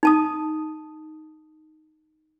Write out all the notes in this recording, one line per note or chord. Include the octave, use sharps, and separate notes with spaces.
D#4 A5 D#6